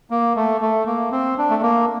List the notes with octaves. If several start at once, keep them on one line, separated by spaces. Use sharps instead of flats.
A#3
A3
A3
A#3
C4
D4
A3
A#3